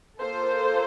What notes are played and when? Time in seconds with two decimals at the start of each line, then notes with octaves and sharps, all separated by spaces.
0.19 A#3 F4 A4 C5